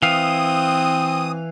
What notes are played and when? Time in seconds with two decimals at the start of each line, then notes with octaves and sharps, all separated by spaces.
0.03 E3 C4 F5 D#6